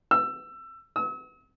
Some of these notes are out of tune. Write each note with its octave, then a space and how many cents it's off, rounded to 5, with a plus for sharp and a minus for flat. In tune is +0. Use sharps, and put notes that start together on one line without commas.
E6 +20
E6 -45